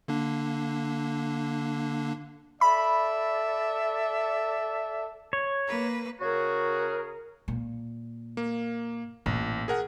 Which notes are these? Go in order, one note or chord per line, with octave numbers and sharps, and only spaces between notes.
D3 A#3 D4
A4 D5 E5 B5
C#5
A#3 B4
C#3 F#4 G#4 A#4
A#2
A#3
A1 A#2
G#4 A#4 F#5